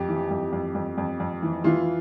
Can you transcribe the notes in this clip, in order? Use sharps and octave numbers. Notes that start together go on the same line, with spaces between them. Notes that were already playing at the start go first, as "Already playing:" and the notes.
Already playing: F2 G4
E3
F2
F2
F2
F2
F2
E3
E3 F4